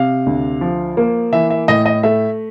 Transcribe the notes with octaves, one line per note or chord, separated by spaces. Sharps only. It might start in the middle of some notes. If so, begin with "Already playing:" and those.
Already playing: C3 F5
D2
F3
A#3
E3 E5
E5
A2 D#5
D#5
A3 E5